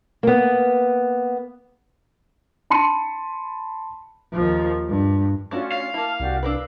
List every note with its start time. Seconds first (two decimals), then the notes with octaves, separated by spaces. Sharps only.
0.23 A#3 B3
2.70 A5 B5 C6 C#7 D#7
4.33 D#2 F3
4.89 G2
5.51 A3 C#4 D4 F4 F#4
5.72 F5
5.94 A#3 E4 A5 F6
6.20 C2 F#4 G4 D5
6.43 D4 A#4 B4 F5 E6